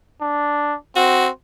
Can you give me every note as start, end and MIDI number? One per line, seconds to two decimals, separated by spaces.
0.21 0.76 62
0.96 1.30 60
0.96 1.27 66